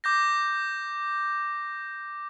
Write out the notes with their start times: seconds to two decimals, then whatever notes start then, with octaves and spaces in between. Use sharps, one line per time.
0.04 D6 G6 A#6